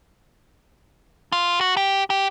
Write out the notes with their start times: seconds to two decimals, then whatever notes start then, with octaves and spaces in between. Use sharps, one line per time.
1.32 F4
1.61 F#4
1.77 G4
2.10 G4